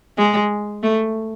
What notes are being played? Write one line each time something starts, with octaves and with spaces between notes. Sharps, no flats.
G#3
A3